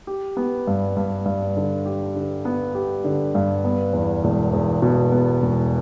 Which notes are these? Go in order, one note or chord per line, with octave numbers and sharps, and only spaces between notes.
G4
B3
G2
G2
G2
D3
G4
D3
B3
G4
D3
G2
B3
E2
E1
E2
B2
B3
E1